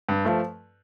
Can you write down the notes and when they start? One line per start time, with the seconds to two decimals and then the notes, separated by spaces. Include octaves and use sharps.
0.09 G2
0.25 F3 A3